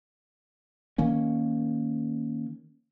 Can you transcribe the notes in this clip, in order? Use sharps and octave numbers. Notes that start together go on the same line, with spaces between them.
D#3 A#3 C#4